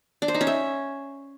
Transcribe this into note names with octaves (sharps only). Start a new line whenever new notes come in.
D4
C5
D#4
C#4
E5